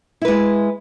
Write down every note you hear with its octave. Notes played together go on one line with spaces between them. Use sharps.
G#3 E4 B4